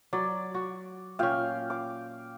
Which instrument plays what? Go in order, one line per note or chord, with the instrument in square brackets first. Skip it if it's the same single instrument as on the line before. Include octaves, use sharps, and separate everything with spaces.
[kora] F#3 [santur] D5
[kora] F#4
[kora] A#2 C#4 [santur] F5 G5
[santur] D6